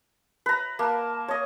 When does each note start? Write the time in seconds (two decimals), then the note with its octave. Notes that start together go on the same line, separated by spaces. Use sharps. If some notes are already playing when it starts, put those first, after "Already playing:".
0.46 B4 A#5
0.79 A#3 A5
1.28 C#5 D#5